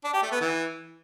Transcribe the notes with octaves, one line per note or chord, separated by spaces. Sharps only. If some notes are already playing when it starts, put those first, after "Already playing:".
D4
G4
A3
B3
E3